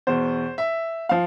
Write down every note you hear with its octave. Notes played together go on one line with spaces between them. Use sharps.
E2 B2 C5
E5
F3 F5